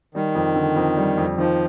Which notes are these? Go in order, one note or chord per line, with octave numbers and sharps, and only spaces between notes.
D#3 G3
F2
D3
F2
G3
F2
D#3 F3